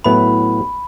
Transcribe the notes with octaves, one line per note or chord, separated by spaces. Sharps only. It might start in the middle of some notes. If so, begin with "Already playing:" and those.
A2 F#3 B3 E4 B5